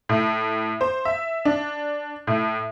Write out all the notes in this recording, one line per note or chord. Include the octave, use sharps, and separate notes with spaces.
A2
C5
E5
D4
A2